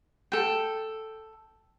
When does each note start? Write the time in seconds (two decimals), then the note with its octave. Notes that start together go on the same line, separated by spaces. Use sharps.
0.32 A4 G5